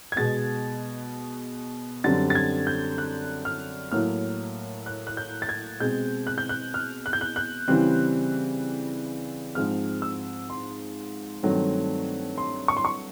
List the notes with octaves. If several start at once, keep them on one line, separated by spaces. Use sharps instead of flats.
G#6
B2 G#3 B3 A6
F#2 D3 G3 C4 A6
A6
G#6
G6
F#6
F6
A2 F#3 A#3 F6
F#6
F#6
G6
A6
G#6
B2 G#3 C4 G6
F#6
G6
F#6
F6
F#6
G6
F#6
F#6
C#3 E3 G3 C4 F#6
G#2 F3 G#3 C4 F6
E6
C6
G2 D#3 F#3 A3 C4
C6
C#6
C6
C#6